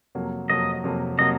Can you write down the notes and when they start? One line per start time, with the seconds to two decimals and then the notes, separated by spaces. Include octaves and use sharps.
0.15 F2 C3 F#3 A#3
0.50 F2 C3 F#3 A#3 D#5
0.84 F2 C3 F#3 A#3
1.19 C3 F#3 A#3 D#5